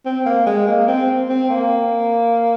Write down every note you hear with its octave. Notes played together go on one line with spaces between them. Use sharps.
C4
A#3
G#3
A#3
C4
C4
A#3